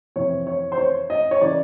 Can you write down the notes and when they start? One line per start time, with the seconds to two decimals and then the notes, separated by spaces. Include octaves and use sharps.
0.16 F2 C3 E3 C#5
0.47 C#5
0.72 C5
0.78 C#5
1.10 D#5
1.31 C#5
1.41 C#3 E3 D5